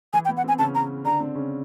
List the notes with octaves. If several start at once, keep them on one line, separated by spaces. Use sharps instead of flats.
E3 E4 G#5
G5
B3
F#5
C4 G#5
C#3 C#4 A5
A#5
D3 D4 A#5
C4
C#3 C#4